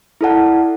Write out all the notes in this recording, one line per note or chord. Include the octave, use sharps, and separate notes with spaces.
E4 A4 D5 F#5 A5